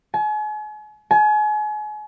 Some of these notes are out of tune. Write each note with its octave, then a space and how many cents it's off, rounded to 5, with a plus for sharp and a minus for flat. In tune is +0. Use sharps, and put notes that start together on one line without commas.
G#5 +40
G#5 +35